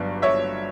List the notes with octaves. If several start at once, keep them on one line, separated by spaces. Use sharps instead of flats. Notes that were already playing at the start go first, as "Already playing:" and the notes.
Already playing: G1 G2 F#3 D5
C#5 E5